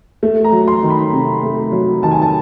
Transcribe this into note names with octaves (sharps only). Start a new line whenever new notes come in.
A3
A#5
F#3
C6
D#3
B5
C3
A3
F#3
D#3 A5
G#5
A5